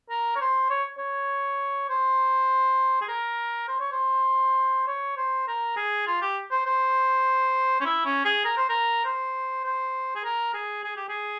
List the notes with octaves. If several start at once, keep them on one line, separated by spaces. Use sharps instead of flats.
A#4
C#5
C5
C#5
C#5
C5
G#4
A#4
C5
C#5
C5
C#5
C5
A#4
G#4
F4
G4
C5
C5
C#4
E4
C#4
G#4
A#4
C5
A#4
C5
C5
G#4
A#4
G#4
G#4
G4
G#4